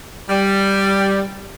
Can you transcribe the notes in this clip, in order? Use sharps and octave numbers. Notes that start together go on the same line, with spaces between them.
G3